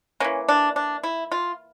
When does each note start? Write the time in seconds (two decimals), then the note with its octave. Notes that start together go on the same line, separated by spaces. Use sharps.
0.20 E3 A#3 C#4
0.49 D4
0.76 D4
1.03 E4
1.32 F4